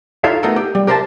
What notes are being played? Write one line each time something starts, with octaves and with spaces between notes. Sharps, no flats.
D#4 F4 A4 C#5 E5 F5
A3 B3 D#4 F#4 A4 A#4
G4
G3
G4 A#4 C5 E5 G5 A5